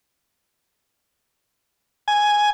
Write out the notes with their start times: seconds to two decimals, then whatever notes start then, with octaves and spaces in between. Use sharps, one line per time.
2.08 G#5